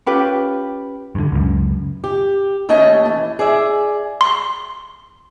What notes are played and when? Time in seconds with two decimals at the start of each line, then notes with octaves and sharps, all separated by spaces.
0.06 C#4 F4 G4 B4
1.15 G2 D3
1.32 C#2 F#2
2.04 G4
2.69 D#2 A3 C#4 C#5 D#5 A5
3.05 E3
3.39 G#4 D5 E5
4.21 C6